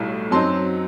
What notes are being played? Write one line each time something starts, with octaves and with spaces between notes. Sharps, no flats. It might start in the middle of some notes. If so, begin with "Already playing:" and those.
Already playing: B1 A2 G3
F#2 F#3 C4 D#4 A5 C6